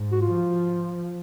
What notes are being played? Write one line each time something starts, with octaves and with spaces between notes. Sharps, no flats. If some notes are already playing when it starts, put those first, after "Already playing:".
Already playing: G#2
F#4
F4
F3